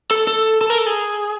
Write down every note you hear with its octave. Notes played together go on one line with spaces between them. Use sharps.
A4
A4
A4
A#4
A4
G#4